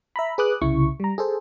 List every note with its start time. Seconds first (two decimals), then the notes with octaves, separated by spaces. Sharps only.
0.16 E5 A#5 B5
0.38 G#4 B4 D6 D#6 F#6
0.61 C2 C#3 E4 C#6
1.00 G3 A#5
1.18 G#4 A4 C5